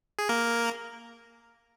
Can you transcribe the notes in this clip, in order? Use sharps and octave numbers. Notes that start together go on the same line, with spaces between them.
G#4
A#3 A#4